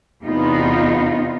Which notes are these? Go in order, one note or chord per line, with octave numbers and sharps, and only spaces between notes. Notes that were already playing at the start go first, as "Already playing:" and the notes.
E2 C3 B3 D#4 F4